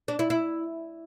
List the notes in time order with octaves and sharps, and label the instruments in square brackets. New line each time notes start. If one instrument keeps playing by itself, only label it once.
[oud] D4
E4
E4